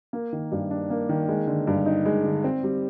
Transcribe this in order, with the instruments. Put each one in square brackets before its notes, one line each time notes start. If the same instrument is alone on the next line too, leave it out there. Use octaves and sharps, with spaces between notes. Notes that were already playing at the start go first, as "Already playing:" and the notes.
[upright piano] A#3
D#3
G2
D4
A#3
D#3
G#3
D3
G2
D#4
G#3
D3
C4
G3